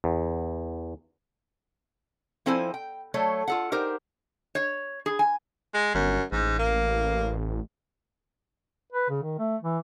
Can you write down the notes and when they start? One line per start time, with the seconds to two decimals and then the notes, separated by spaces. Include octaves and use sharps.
0.04 E2
2.46 F3 C4 E4 A4 C5 G#5
2.74 G5
3.14 F#3 A3 A4 C#5
3.48 F4 A4 F#5
3.72 D#4 G4 A#4 C5
4.55 C#5
5.06 G#4
5.19 G#5
5.74 G#3
5.94 G1 F#2
6.32 A1 G#2
6.59 A#3
8.93 B4
9.10 C#3
9.22 D#3
9.39 A3
9.62 E3